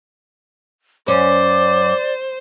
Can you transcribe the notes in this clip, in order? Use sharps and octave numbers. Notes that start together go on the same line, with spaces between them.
F#2 C#4 C5 D5 D6